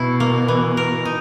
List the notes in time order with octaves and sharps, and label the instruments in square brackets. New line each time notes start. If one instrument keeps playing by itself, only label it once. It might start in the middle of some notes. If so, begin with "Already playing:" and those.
Already playing: [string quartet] B2 [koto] E4
[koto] A#3
E3
A#4
D#4